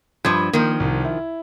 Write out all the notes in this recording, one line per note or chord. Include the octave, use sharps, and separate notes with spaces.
G2 F3 G#6
D#3 F3 A#3
C2
E4